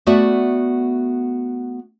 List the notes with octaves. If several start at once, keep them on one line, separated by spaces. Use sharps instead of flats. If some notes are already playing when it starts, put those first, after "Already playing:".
A3 B3 F#4 D5 E5